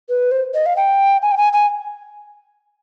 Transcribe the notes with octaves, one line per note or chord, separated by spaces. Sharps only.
B4
C5
D#5
F5
G5
G#5
G5
G#5
G#5